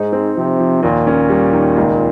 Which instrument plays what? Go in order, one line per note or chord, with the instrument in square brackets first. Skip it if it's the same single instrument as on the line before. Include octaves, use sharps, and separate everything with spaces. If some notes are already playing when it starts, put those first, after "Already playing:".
Already playing: [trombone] G#2 [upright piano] D#4
[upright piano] C4
[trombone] C3 [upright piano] F3
[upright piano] F3
[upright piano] D#2 [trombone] A#2
[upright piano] C#4
G3
D#3
C#2